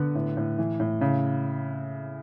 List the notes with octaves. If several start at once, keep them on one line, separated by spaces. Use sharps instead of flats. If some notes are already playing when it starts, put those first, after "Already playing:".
Already playing: D3 B3
A2
A2
E3
A2
C#3